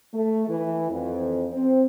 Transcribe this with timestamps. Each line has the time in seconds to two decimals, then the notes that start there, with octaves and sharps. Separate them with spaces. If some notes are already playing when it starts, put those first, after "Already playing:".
0.13 A3
0.48 E3
0.90 F2
1.52 C4